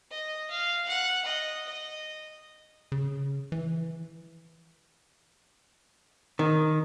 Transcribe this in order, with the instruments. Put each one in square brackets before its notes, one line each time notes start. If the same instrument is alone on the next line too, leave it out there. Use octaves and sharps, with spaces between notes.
[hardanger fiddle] D#5
F5
F#5
D#5
D#5
[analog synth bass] C#3
E3
[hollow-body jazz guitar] D#3